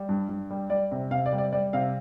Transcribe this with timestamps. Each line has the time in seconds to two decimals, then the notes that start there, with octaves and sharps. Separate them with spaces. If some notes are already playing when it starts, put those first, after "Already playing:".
Already playing: G3
0.09 G2
0.29 G2
0.50 G3
0.70 G3 D5
0.91 C3
1.11 C3 F5
1.26 D5
1.33 G3
1.38 D5
1.52 G3 D5
1.73 C3 F5